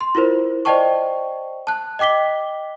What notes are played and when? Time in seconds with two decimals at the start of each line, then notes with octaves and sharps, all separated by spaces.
0.01 C6
0.15 E4 F4 A#4 C5
0.65 C5 D5 D#5 G5 A5 C#6
1.67 A5 F#6
1.99 D#5 G5 D6 B6 G7